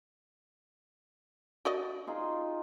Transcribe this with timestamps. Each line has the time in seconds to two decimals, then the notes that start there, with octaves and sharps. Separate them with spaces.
1.65 F#4 D5 D#5
2.07 D#4 F4 G#4